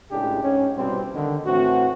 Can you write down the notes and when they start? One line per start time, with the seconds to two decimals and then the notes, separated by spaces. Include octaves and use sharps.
0.11 C#2 A2 C#3 G#3 D4 G4
0.43 G#2 C#4
0.77 C2 B2 G3 C4
1.14 D3 D#3
1.46 A2 E3 C4 F#4